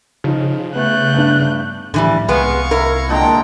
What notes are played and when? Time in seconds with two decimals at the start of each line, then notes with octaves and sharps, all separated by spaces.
0.24 C#3 F3 D#4 F4
0.75 A3 B3 F#6 G6
1.14 G2 B3 D4
1.94 A2 D3 E3 F3 G3
2.29 C2 G#3 B3 F5 C#6
2.71 E4 A#4
3.09 A#2 D3 G#3 G5 A#5